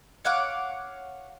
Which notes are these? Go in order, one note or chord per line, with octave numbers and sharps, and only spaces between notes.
C#5 F5 F#5 D6